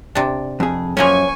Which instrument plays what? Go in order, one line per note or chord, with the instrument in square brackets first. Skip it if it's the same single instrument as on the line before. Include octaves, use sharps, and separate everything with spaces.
[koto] C3 D4
[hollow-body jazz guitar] F2 G#4
[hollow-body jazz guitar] F#2 [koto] F3 A#3 C#4 [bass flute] C#5 [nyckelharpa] G#5 C#6